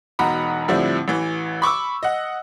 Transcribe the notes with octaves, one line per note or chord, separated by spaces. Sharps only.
E1 B2 D#4 F#5 A#5 B5
A2 D3 F3 G3 C4 E4
A1 E3
B5 C#6 D6 E6
D#5 F#5